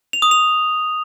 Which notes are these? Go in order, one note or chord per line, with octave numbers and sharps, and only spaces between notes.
F7
D#6
F7